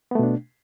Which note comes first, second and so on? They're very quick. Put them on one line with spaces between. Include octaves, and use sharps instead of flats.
B3 A3 B2 D4